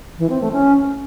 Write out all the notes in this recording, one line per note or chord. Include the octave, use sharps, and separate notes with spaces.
E3
C4
A3
C#4